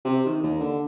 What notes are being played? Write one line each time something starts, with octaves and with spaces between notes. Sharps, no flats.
C3
D#3
D#2
D3